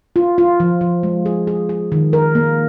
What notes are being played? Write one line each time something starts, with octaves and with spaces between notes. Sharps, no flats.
F4
F4
F3
F3
G#3
G#4
G#4
G#4
D#3
A#4
A#3